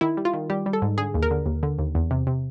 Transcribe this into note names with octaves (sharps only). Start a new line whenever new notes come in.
D#3 E4
G3
F4
D#3
G3 G4
G3
A4
G#2
D3 G#4
D#2
A#4
D3
D#2
D3
D#2
E2
C3
C3